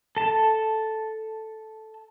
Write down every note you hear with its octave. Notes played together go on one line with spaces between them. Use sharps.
A4 A5